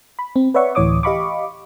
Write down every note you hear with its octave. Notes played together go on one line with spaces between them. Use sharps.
B5
C4
B4 C#5 D5 E5 F#5 C#6
D2 A2 E3 C#5 D6 D#6
G4 D#5 F5 B5 C#6 D6